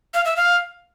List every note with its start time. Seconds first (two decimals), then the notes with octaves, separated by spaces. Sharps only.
0.14 F5
0.25 E5
0.36 F5